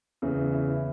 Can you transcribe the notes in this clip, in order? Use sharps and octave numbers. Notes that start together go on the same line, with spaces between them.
E2 C#3 E3
E4